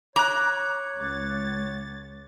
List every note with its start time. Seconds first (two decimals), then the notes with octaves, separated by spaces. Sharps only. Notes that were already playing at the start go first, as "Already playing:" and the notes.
0.16 C#5 A#5 D6 F#6
0.98 C#2 A6